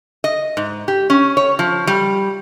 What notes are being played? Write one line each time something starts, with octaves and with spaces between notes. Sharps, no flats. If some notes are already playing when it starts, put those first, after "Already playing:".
D#5
G#2
G4
C#4
C#5
F3
G3